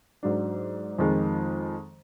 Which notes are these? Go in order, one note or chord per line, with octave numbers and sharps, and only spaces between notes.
G#2 F#3 D4
F2 D#3 G#3